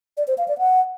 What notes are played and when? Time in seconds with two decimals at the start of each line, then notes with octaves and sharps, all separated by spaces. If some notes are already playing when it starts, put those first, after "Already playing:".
0.17 D5
0.28 C5
0.38 F5
0.48 D5
0.58 F#5